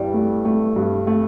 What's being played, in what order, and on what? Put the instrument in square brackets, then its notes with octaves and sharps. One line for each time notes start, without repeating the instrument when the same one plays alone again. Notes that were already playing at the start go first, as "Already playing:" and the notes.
Already playing: [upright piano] G2 E3 [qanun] G3
[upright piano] A3
A3
G2
A3